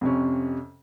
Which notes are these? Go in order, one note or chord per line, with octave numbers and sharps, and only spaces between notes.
F2 C3 C#4